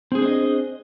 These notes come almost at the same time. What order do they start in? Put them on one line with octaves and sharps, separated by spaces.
C4 G#4 D4 C5 D#5